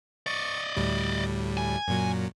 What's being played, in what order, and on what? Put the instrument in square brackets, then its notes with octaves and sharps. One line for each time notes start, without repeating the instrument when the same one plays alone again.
[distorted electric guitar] D5 D#5 [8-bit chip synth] C#6
[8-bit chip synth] D2 A2 G3
[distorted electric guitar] G#5
[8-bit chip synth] F#2 A#2 F#3